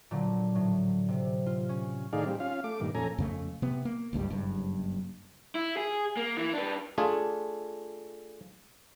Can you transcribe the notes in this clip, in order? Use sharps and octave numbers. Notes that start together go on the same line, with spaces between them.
A#2 D3 F#3
A2 F#3
C3
F4
C#4
A2 D#3 D#4 G#4 D5 F5
G3 C4
C#4 F4 F5
A3 D6
G2 A#2 D#3
F2 A#2 C#4 A4 G#5 A#5
F2 C#3 A3
C3 B3
A#3
F#1 C#2 G2 G3
F#1 G2
E4
G#4
A#3
E3
D4 B4
A3 D4 F4 G#4